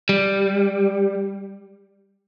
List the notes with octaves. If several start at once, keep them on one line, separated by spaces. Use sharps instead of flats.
G3